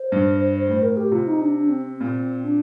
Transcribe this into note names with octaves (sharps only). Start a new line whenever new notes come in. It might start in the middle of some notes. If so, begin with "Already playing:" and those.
Already playing: C5
G2
A2 C5
A#4
G4
C3 F4
D#4
D4
D4
C4
A#2 C4
D4